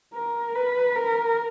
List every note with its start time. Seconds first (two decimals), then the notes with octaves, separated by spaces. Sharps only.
0.14 A#4
0.55 B4
0.96 A#4